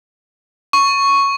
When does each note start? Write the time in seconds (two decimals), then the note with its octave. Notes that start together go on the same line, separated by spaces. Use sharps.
0.73 C#6